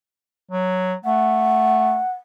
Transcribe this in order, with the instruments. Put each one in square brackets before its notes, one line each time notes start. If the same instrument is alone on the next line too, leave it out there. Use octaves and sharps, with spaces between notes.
[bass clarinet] F#3
[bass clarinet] A3 [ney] F#5